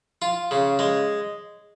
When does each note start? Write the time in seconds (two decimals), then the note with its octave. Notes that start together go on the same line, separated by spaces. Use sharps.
0.22 F4
0.51 C#3
0.79 G#3